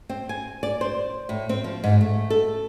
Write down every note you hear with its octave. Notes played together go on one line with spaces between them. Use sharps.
C4
G#5
D5
C5
A2
C4
F3
G#2
A3
A4